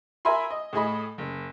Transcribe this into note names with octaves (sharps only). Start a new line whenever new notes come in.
A#4 E5 G#5 B5 C6
D#5
A2 G#4 D#5 B5
F#1